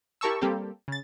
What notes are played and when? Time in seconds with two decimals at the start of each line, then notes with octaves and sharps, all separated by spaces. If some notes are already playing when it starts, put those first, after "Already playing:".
0.21 E4 G4 A#4 A5 C#6 E6
0.41 G3 A#3 C4 G4 A4
0.88 C#3 A6